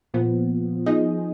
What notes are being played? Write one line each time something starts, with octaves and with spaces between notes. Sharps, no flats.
A#2 F3 B3
F3 B3 D#4 G#4 D#5